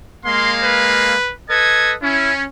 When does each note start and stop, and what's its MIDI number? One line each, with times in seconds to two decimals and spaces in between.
0.25 1.15 56
0.25 1.15 58
0.25 1.15 77
0.25 0.53 84
0.63 1.33 71
1.50 1.94 69
1.50 1.94 71
1.50 1.94 75
1.50 1.92 92
2.02 2.44 61
2.02 2.32 64